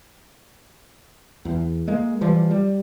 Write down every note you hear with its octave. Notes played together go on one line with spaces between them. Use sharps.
E2
G#3 A#3
E3 F3 G3
G3